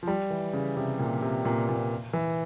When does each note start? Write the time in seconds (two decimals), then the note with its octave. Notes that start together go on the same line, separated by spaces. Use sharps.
0.03 F3
0.07 G3
0.30 E3
0.53 C#3
0.77 C3
0.99 A#2
1.22 C3
1.45 A#2
1.69 A#2
2.13 E3